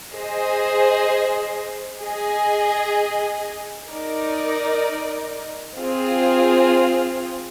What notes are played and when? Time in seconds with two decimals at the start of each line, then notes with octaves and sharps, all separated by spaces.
0.15 G#4 C5 D#5
2.02 G#4 D#5 G#5
3.90 D#4 A#4 D5
5.77 C4 F4 G#4